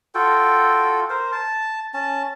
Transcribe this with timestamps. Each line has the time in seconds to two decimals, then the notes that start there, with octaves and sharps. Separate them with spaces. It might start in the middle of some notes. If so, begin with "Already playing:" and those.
0.15 F4 F#4 A4 G5
1.10 A#4 C5
1.32 A5
1.94 C#4 A5